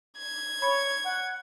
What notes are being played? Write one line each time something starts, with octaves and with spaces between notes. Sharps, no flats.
G#6
C#5 B5
F#5